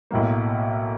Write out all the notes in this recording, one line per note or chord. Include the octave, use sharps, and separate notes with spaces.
B1 A2 F#3 A#3